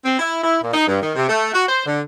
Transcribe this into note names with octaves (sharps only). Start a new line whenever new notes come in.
C4
E4
E4
A#2
D#4
G2
D#3
C3
A3
F#4
C5
D3